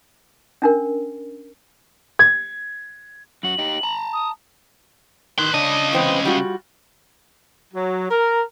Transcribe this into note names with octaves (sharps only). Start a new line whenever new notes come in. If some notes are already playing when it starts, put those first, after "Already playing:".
C#4 D4 A#4
G#6
F#2 F#4 F#7
D#4 G4
A5 A#5
D#6
D#3 B4 C6
C#3 D4 D#5
E2 C4 B4
G3 F4 F#4
F#3
A#4